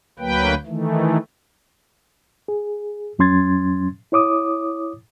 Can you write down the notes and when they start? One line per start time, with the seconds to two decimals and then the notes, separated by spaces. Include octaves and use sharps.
0.19 D2 F#3 A#3 B4 G5
0.66 D#3 E3 A3
2.48 G#4
3.19 F2 F#3 C#4 C6 G#6 A6
4.12 E4 C#5 D6 D#6